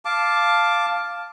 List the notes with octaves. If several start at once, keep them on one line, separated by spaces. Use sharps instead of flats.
F5 A5 D6